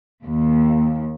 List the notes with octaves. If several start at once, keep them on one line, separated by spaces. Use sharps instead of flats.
D#2